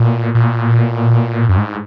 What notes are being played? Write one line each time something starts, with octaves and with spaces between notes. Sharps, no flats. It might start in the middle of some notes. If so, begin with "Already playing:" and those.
Already playing: A#2
A#2
F#2
G#2